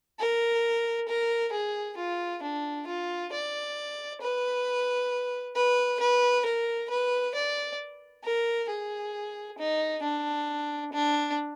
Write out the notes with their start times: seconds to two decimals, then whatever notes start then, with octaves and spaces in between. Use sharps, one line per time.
0.19 A#4
1.08 A#4
1.52 G#4
1.97 F4
2.43 D4
2.87 F4
3.32 D5
4.21 B4
5.55 B4
6.00 B4
6.45 A#4
6.90 B4
7.34 D5
8.24 A#4
8.69 G#4
9.59 D#4
10.03 D4
10.93 D4